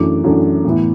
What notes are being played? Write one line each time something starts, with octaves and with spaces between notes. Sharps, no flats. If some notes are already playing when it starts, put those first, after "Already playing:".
Already playing: F#2 E3 A3 D4 D6
F#2 E3 A3 D4
A2 E3 B3 E4